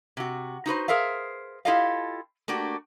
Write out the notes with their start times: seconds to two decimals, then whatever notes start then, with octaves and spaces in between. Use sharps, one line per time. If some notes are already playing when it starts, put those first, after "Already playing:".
0.17 C3 F#4
0.66 D#4 F#4 B4 C5
0.88 G#4 A#4 C5 E5 F5
1.65 E4 F4 G4 A4 D#5 F5
2.48 A3 A#3 D4 F#4 G4